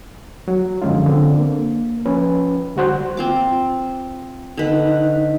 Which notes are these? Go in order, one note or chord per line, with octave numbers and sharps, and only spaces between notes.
F#3
F#2 D3 F3 G#3 C#4 F4
D3 C4
A#3
F3 C#4 B4
D3 G3 F#4 C5 F#6
C4 F4 D6
D3 D#4 B4 D#5